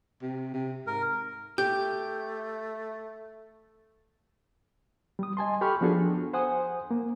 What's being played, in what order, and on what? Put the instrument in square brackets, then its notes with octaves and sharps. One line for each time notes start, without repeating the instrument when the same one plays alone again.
[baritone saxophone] C3
C3
[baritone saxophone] G#2 [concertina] A#4
[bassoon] A3 [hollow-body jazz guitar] G4 [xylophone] G6
[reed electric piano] G3 D#6
D#5 G#5 A5 C6
G4 A4 B5 C#6 F6
F3 B3 D4 F#4 G#4 A4
C5 F#5 G#5 D#6
A#3